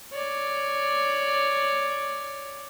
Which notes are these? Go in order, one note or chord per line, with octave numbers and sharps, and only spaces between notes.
C#5 D5